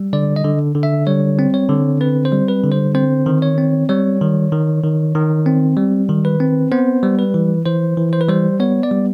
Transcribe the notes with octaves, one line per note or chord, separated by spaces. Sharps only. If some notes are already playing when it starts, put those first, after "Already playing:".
Already playing: G3
D3 D5
D#5
D3
D3
E5
G3 C#5
C4
C#5
D3
C4 B4
C5
G3
B4
D3
C5
C4 C5
D#3
C#5
C4
G3 C#5
D#3
D#3
D#3
D#3
C4
G3
D#3
B4
C4
B3 C5
G3
B4
E3
E3 C5
E3
C5
B4
G3 C5
B3 C#5
D5
G3